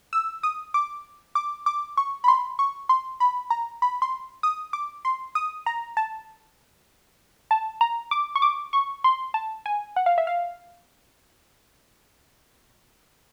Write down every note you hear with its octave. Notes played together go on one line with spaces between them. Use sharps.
E6
D#6
D6
D6
D6
C#6
B5
C6
C#6
C6
B5
A#5
B5
C6
D#6
D6
C6
D#6
A#5
A5
A5
A#5
D6
C#6
D6
C#6
C6
A5
G#5
F#5
F5
E5
F5